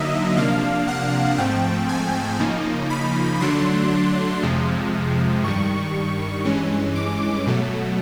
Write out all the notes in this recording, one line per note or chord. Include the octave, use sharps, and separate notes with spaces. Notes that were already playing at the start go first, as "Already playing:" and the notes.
Already playing: D3 F#3 A#3 D#4 D#5 E5
C3 F3 A#3 D4 F5
F#5
G#2 F3 A3 C4 G5
G#5
C#3 F3 A#3 D#4
B5
D3 F#3 A3 D4 C6
F2 C3 F3 G#3
G2 D#3 G3 C#6
G2 E3 G#3 C#4
D6
B2 F#3 A3